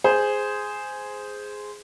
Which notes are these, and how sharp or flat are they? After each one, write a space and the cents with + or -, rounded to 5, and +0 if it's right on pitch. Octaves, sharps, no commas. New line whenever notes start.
G#4 +0 C5 -10